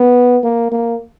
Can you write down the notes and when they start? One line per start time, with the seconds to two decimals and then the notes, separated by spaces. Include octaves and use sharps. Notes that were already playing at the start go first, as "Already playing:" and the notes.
Already playing: B3
0.44 A#3
0.72 A#3